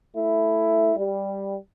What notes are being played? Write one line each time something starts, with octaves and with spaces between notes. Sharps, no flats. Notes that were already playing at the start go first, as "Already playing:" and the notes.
A3 E4
G3